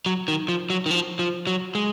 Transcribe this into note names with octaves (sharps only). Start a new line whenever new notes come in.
F#3
D#3
F3
F#3
D#3
F3
F3
F#3
G#3